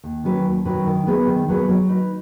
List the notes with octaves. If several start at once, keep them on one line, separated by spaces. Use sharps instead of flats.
D#2
D#3 F#3 C#4 B4
D#2
D#3 F#3 C#4 B4
D#3
F#3 B3 G#4 B4
D#3
F#3 B3 G#4 B4
F#3
D#4 B4